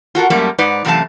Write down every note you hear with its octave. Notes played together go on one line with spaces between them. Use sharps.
F4 F#4 A4 A#4
F#2 G3 A3 A#3
G#2 D#4 B4 D5
F#2 C3 E3 A3 F5 A5